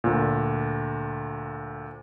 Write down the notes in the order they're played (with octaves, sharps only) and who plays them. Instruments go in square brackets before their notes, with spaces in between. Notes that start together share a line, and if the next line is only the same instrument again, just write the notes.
[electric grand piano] D2 A#2